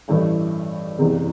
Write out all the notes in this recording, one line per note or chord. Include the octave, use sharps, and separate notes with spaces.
A1 G2 E3 A3
F#1 E2 C3